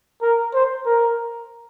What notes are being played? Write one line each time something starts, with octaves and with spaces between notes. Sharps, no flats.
A#4
C5
A#4